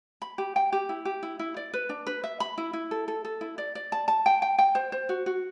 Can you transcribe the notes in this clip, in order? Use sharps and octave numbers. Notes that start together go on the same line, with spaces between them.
B5
G4
G5
G4
E4
G4
E4
E4
D5
B4
D4
B4
E5
B5
E4
E4
A4
A4
A4
E4
D5
D5
A5
A5
G5
G5
G5
C5
C5
F#4
F#4